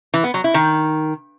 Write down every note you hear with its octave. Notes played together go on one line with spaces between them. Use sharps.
E3
B3
F#3
E4
D#3